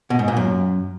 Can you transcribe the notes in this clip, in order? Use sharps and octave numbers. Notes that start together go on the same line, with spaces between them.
B2
G#2
A#2
F#2